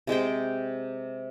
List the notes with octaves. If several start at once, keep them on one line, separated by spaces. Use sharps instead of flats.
C3 G#3 C5 G5